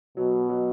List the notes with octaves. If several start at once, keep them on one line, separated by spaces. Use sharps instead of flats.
B2 F#3
F#3